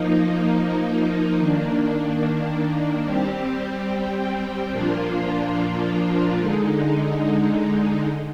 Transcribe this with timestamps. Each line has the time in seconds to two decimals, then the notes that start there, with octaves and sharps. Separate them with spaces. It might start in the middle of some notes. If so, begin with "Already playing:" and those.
Already playing: F3 A#3 D#4
1.38 D#3 A#3 D4
3.05 G3 C4 G4
4.72 A#2 F3 A#3 D4 F4
6.39 D3 G#3 D#4